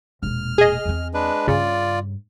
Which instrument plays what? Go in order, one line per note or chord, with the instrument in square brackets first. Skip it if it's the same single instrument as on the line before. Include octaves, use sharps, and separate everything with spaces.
[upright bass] E1 A#2 [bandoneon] F6
[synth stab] G#4 D#5
[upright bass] E2 C4
[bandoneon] G#3 D4 B4
[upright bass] G2 [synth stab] C#3 [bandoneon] F4 D5